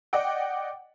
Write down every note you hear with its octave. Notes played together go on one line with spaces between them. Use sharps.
D5 D#5 F#5 G5